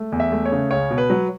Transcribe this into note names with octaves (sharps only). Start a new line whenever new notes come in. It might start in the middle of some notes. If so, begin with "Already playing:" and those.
Already playing: A3
E2
E5
A3
C#5
C#3
C#2 C#5
B2
B4
F#3